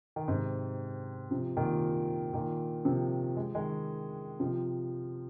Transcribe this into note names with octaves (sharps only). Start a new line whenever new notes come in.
D#3
G#2 C3
C3 F3
A#2 D#3
A#2 D#3
C3 F3
G#3
D#3 G#3
C3 F3